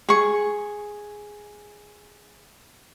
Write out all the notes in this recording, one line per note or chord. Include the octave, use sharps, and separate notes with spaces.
G#4 C#6